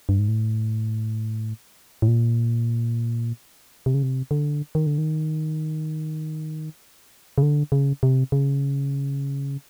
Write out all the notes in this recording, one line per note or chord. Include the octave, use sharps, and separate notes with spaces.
G2
G#2
A2
A2
A#2
C3
C#3
C3
D3
D#3
D3
D#3
C#3
D3
C#3
C3
C#3